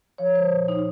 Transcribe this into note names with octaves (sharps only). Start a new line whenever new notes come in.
F3 C#5
C5
A#2
D#4